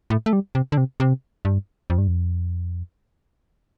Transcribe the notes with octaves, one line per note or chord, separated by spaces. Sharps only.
A2
A3
G3
C3
D3
C3
C3
G2
F2
G2
F2